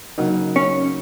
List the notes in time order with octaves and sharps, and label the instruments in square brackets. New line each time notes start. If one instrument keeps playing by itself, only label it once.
[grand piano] C#3 F#3 A#3 D#4
[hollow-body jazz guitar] C#4